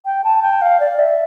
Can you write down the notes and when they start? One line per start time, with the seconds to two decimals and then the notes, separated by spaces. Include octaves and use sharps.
0.05 G5
0.24 A5
0.42 G5
0.62 F5
0.80 D5
0.99 E5